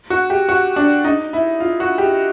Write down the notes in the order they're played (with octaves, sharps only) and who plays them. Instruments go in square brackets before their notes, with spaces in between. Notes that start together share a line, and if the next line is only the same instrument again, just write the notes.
[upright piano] F#4
G4
F#4
D4
D#4
E4
F4
F#4
G4